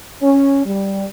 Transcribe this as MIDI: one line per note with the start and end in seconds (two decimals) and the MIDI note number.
0.23 0.65 61
0.66 1.05 55